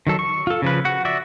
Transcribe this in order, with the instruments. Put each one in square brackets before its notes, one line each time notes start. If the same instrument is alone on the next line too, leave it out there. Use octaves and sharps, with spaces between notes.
[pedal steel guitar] D#3 F#3 A4
C#6
F4 A4
C#3 F3 B4
F#4 F#5
F#4 D5 E5